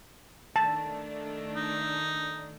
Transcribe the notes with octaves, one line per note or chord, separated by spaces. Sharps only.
D#3 A3 D4 A5
D#4